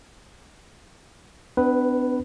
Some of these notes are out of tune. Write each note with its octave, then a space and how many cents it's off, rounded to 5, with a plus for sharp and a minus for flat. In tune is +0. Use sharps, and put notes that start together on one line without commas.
B3 +40 D4 +0 B4 +0